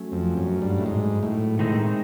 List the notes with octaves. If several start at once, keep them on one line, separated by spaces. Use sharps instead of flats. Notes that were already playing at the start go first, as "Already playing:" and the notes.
Already playing: F#3 A3 C#4
F2
F#2
G2
A2
G#2
A2
A2 D#3 G#3 C4 D#4